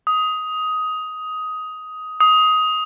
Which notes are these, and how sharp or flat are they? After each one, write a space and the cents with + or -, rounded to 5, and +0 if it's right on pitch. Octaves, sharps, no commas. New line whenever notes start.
D#6 +10
D#6 +15